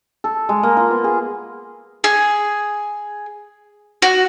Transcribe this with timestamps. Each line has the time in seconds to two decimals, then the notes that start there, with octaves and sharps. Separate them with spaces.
0.24 A4
0.49 G#3
0.63 A#3
0.77 F4
0.91 B3
1.04 G#4
2.04 G#4
4.02 F#4